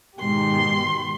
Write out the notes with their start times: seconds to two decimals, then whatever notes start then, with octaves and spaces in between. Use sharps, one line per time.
0.18 G#2 B2 D#3 G4 C6